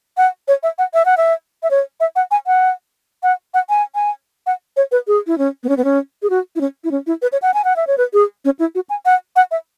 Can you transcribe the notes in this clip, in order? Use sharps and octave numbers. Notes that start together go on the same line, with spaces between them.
F#5
C#5
E5
F#5
E5
F#5
E5
E5
C#5
E5
F#5
G#5
F#5
F#5
F#5
G#5
G#5
F#5
C#5
B4
G#4
E4
C#4
B3
C#4
B3
C#4
G#4
F#4
E4
C#4
E4
C#4
E4
B4
C#5
F#5
G#5
F#5
E5
C#5
B4
G#4
C#4
E4
F#4
G#5
F#5
F#5
E5